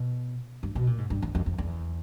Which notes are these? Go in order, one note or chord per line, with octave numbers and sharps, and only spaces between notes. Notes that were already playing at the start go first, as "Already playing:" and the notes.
Already playing: B2
G2
B2
A#2
G#2
G2
E2
F2
F2
E2